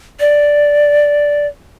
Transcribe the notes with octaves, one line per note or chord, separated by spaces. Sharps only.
D5